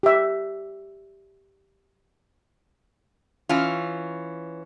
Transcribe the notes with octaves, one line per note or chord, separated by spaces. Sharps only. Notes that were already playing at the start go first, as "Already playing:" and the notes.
G4 E5
E3 C#4 F4